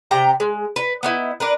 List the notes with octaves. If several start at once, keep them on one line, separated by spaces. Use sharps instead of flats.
C3 G5 A#5
G#3
B4
B3 D#4 E4
D4 A#4 B4